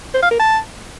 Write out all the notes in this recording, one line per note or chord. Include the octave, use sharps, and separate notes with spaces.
C5
F5
A#4
A5